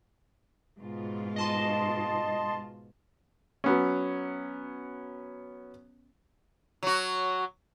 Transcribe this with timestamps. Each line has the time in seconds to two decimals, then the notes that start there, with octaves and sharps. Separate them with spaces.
0.79 G#2 B2 F4
1.36 D#5 A5 C6
3.64 F#3 B3 C#4
6.83 F#3 F#4